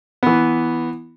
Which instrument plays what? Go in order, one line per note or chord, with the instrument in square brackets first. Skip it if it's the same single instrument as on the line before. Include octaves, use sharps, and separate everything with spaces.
[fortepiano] E3 B3